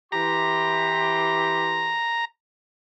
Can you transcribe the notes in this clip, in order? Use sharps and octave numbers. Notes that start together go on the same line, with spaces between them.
E3 G4 A#5 C6